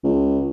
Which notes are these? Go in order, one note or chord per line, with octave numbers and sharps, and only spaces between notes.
C#2